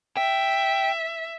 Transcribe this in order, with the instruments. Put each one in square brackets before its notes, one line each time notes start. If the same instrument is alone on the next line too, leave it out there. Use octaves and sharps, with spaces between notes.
[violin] E5 [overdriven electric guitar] G5